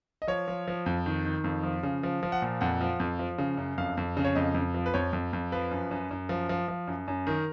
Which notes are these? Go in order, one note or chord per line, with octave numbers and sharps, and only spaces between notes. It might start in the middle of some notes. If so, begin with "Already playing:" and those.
D#5
F3 C#5
F3
F3
F2
D#3
D#3
F2
F3
C#3
F3
F3
F#5
A#2
F2 F#5
F3
F2
F3
C#3
F#2
F2 F5
F2
C#3
C#5
F2 D#5
F2
F3
B4
F2 C#5
F2
F2
F3 B4
F#2
F#2
F#2
F3
F3
F3
F#2
F#2
D#3 A#4